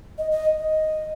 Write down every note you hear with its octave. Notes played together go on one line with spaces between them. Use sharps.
D#5
D#5
D#5